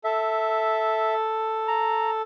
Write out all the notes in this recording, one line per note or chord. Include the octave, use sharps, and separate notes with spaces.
A4 E5
A#5